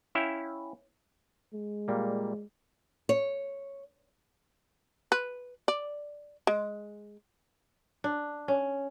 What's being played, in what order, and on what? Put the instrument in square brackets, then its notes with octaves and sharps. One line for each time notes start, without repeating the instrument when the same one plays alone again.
[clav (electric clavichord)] C#4 E4 E5 F5 G5
[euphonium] G#3
[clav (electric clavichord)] A#2 G3 A#3
[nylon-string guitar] C#5
[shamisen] B4
D5
G#3
[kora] D4
C#4